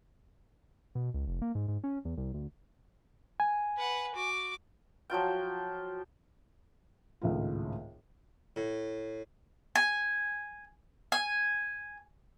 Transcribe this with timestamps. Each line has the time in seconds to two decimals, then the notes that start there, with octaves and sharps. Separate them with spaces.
0.95 B2
1.14 C#2
1.27 F1
1.42 A#3
1.55 G#2
1.68 G#2
1.84 C#4
2.05 E2
2.17 C2
2.34 D2
3.40 G#5
3.77 B4 F#5
4.14 F#4 D6
5.10 F3 F#3 F4 G5
7.22 G#1 C#2 A2 F4
8.56 A2
9.75 G#5
11.12 G#5